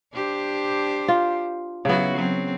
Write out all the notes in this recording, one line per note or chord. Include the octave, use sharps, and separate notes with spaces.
D4 G4 C5
F4
C#3 F#3 B3 E4 F#4
F#3 C4